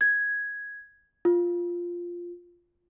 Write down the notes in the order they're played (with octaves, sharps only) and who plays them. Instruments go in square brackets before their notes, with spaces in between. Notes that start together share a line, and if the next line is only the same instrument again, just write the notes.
[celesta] G#6
F4